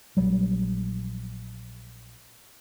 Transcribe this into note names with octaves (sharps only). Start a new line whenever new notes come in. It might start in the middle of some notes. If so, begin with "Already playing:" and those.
A#1 F#3 G3